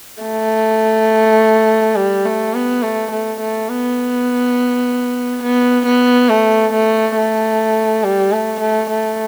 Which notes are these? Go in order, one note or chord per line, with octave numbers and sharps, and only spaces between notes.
A3
G3
A3
B3
A3
A3
A3
B3
B3
B3
A3
A3
A3
G3
A3
A3
A3